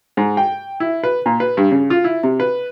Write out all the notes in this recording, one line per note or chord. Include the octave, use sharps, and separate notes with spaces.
G#2
G5
E4
B4
A#2
B4
G2
C#3
F4
E4
C3
B4